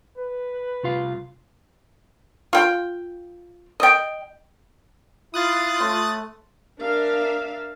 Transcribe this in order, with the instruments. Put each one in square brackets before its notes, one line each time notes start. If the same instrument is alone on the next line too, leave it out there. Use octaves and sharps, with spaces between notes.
[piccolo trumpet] B4
[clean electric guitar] C2 F4 F5
[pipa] F4 G5
D#5 G5
[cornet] E4 [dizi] F4 [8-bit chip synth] D#6 F#6 A6
[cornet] A3 [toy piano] C#5 C6
[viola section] D4 A#4 E5 F5